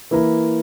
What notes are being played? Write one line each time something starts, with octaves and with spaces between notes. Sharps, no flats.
E3 A#3 E4 A#4